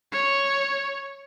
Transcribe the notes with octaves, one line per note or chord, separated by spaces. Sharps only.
C#5